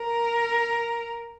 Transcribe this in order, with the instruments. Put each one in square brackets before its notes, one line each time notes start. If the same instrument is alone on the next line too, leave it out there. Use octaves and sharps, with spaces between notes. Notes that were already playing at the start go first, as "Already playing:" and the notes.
Already playing: [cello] A#4